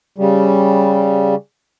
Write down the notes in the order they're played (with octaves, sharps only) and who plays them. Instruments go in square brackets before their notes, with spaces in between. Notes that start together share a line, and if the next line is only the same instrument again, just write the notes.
[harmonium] C#3 G3